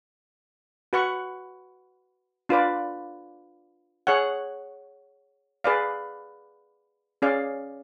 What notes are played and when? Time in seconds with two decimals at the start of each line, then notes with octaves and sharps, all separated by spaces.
0.93 F#4 B4 F#5 C#6
2.49 D4 F4 B4 D5
4.07 G#4 C#5 F#5
5.64 G#4 B4 D5 F5
7.22 C#4 G#4 D5 F5